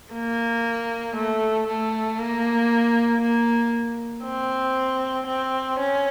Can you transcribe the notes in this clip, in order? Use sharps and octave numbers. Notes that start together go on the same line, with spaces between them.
A#3
A3
A3
A#3
A#3
C4
C4
C#4